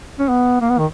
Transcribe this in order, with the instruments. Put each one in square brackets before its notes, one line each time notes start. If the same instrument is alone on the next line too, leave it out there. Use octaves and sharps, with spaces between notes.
[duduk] C#4
B3
A#3
B3
D#3